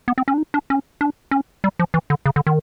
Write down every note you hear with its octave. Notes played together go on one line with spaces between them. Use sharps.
B3
C4
C#4
D4
D#4
D4
C#4
D4
C#4
G3
F3
E3
D3
C#3
D3
D#3